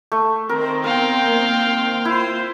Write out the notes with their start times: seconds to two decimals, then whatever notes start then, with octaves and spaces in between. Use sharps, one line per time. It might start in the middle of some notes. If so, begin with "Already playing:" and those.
0.12 A3
0.49 D#3 C4 A#4 C5
0.84 B3 A#4 F5 G5
1.27 A#3
2.05 E4 F4 C5